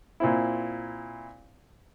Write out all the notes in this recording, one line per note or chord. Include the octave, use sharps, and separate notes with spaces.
A#2 C4 E4